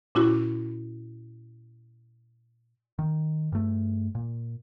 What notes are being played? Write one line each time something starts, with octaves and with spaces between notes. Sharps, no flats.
A#2 C#4 E4 F#4
D#3
G2 A3
A#2